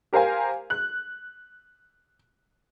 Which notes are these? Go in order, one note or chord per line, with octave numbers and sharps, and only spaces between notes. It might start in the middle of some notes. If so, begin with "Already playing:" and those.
G4 A#4 C5 F5 G#5
F#6